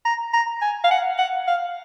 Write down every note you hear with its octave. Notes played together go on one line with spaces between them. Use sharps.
A#5
A#5
G#5
F5
F#5
F#5
F5